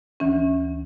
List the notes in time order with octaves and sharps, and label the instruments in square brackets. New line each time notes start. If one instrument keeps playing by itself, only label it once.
[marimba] D2 E3 C#4